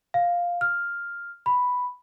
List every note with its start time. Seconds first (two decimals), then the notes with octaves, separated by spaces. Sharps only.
0.14 F5
0.61 F6
1.46 B5